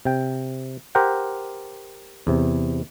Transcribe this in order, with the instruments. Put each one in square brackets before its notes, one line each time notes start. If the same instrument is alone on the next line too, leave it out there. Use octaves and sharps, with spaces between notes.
[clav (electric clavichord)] C3 G5
G4 A#4 C5 F#5 G5
E2 C3